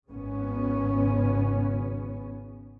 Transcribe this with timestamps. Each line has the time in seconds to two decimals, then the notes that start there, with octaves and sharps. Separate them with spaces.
0.10 G#1 C#3 B3 C#4